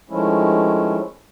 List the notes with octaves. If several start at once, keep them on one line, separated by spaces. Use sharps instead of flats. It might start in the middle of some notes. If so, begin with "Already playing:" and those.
D#3 F3 G#3 A3 C#4 E4